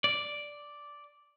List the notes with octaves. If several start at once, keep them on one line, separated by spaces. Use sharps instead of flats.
D5